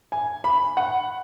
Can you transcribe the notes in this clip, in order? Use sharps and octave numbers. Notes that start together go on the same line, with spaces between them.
G#5
B5
F#5